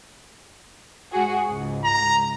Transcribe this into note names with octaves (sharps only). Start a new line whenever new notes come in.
G#2 F#4 G#4
C#2 G#2
A#5